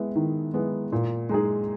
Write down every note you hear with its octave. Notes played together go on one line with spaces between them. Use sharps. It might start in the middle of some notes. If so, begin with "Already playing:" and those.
Already playing: G#3 B3 E4
D#3
G#3 B3 E4
A#2
G#3 D#4 G#4